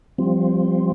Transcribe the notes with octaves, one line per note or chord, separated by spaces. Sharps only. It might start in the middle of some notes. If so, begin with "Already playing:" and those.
F3 G3 C4